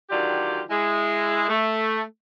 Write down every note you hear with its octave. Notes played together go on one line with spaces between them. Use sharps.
D3 D#3 F#3 F4 G4 D5
G#3 E4
A3